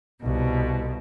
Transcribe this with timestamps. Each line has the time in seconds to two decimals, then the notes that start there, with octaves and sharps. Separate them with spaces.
0.23 C2 B2